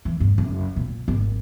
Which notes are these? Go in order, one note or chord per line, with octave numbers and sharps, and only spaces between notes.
E3
G2
F#1
A#2
G#1